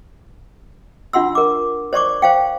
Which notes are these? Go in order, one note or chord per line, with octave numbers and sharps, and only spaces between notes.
D4 F4 F#5 C6 E6
A#4 D6
C5 D5 C#6 D6
C5 F5 G5